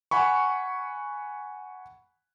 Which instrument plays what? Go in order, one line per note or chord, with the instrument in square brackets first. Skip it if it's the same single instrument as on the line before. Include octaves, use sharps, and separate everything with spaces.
[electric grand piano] F#5 G#5 B5 C#6